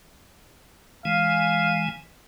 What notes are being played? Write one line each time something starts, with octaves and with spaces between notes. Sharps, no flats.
E3 G#3 F5 G#5